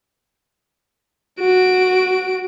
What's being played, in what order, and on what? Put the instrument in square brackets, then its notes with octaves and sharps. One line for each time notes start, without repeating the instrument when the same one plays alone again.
[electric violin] F#4 D7